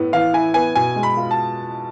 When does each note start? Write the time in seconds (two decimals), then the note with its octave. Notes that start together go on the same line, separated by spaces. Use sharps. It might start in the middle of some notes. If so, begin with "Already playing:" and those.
Already playing: A2 B3 E4
0.13 E3 F5
0.33 E4 G#5
0.54 B3 G#5
0.75 B2 G#5
0.96 G#3
1.03 B5
1.17 F4
1.31 A5